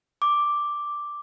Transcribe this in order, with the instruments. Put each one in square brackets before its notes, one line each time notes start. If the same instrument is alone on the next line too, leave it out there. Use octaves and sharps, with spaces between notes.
[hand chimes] D6